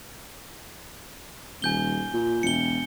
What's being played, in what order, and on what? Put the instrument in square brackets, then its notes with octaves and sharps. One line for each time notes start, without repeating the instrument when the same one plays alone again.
[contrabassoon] D#1 [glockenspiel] G#5 G6 G7
[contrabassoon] A#2
[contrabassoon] E1 [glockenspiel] C#7 G7